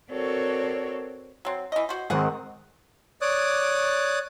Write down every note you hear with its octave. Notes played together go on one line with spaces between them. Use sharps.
C4 F#4 A4 A#4 C#5 D5
F#3 C4
E3 D#5
F#4 C5
G#2 D#3 C4 G#4 F#5
C#5 D5 D6 D#6 F#6